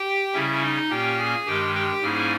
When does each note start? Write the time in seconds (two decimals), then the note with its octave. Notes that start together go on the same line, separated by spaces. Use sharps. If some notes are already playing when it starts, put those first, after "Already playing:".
Already playing: G4 G5
0.33 C#3 G3 C#4 E4 E5
0.62 D#4 D#5
0.90 A#2 A#3 C#4 G4 G5
1.18 G#4 G#5
1.46 G2 D#3 G#3 G4 G5
1.74 G4 G5
2.02 G#2 G3 A#3 C#4 E4 G#4 G#5